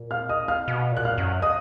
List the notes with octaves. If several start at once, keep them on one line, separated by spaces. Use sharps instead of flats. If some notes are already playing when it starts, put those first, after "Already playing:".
Already playing: A#2
F5 F6
D#5 D#6
F5 F6
B2
A#2
F#6
F5 F6
F#2
D#5 D#6